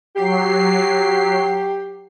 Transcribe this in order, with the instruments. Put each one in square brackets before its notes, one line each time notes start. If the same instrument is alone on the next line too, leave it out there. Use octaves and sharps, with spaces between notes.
[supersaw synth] F#3 C7 [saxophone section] G4